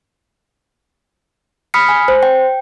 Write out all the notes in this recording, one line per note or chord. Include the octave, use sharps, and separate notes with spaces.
B5 D#6 F6 B6 C#7
G#5
C5
G5